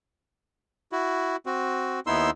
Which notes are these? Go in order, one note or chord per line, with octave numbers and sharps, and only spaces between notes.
E4 F#4
C4 F#4
D#2 B3 D#4 E4 C6 E6